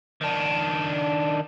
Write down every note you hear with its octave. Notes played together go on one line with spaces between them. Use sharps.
D#3 D4